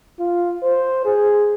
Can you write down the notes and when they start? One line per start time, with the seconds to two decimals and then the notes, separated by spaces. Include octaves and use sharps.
0.20 F4
0.63 C5
1.05 G#4